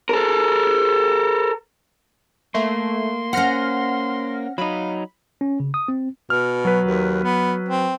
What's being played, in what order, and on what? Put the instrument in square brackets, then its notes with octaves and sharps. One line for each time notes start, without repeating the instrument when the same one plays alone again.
[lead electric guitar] A4 A#4
[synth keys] A3 [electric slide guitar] A#3 [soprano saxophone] C6
[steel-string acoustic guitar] C#4 C5 [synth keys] F#5 F6 A#6
[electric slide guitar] F#3 D#4 [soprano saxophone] F5 [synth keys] B5
[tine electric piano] C#4
C#3
D#6
C4
[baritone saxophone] B2 [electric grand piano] F6
[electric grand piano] F#3 B4
[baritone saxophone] D#2
B3
C4